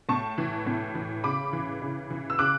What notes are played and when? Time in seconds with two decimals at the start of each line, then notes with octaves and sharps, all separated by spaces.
0.09 A2 A5 C#6
0.38 E3
0.66 A2
0.95 E3
1.24 C#3 B5 D6
1.53 E3
1.82 C#3
2.10 E3
2.30 E6
2.39 C#3 D6 F#6